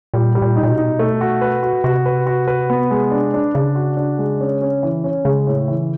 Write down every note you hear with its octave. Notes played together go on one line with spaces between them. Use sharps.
A#2 G3
G3
A#2
D#4
A#2
B2
D#4
A3
F#4
B4
F#4
C3 F#4
B4
F#4
B4
B3
G#3
D4
D4
C#3 D4
F#4
D4
G#3
C#4
C#4
E3
C#4
C#3 G#3
A2
E3